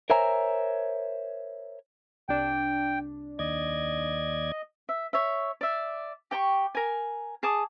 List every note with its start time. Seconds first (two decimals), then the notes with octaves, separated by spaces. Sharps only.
0.10 A#4 C5 C#5 E5 G#5 A#5
2.29 C2 D4 G5
3.39 D#2 D5 D#5 G#6
4.89 E5
5.13 C#5 E5
5.61 D5 E5
6.31 G4 G5 A5 C#6
6.75 A#4 G#5
7.43 G#4 A5 D6 D#6